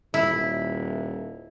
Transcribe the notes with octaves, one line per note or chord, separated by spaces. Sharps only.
D#1 E4